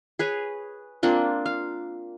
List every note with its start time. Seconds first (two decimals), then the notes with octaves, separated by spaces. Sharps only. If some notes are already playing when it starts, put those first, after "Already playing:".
0.19 G#4 B4 C#5
1.03 A#3 C4 D4 F4
1.46 F5